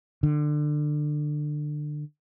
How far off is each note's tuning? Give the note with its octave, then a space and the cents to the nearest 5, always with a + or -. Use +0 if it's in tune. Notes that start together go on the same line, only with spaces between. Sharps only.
D3 +25